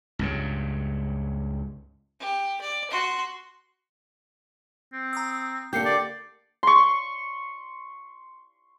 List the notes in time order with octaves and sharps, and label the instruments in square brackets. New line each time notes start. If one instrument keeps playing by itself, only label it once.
[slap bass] C#2 G2 C#3
[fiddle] G4
D5
F#4 C6
[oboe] C4
[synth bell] A#5 D#6 E6
[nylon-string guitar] D3 A#3 G4 [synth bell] G6 C7 C#7
[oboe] D5
[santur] C6 C#6